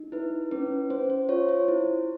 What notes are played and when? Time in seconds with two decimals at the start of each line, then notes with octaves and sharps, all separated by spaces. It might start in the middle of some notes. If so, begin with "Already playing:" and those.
Already playing: D#4
0.12 E4 B4
0.51 C#4 B4
0.90 C#4 C5
1.10 C5
1.29 F4 C#5
1.49 C5
1.68 E4